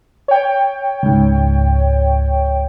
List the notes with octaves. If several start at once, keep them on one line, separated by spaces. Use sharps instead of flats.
C#5 G5
C#2 G#2